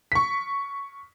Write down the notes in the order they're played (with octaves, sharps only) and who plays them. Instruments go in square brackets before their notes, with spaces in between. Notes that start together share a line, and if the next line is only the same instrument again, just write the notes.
[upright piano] C#6 B6